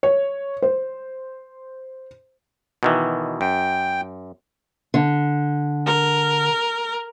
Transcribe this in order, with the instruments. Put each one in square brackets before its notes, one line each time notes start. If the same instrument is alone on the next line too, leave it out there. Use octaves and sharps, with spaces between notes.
[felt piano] C#5
C5
[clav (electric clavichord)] B2 D#3 E3
[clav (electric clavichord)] F#2 [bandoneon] G5
[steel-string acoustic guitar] D3
[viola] A#4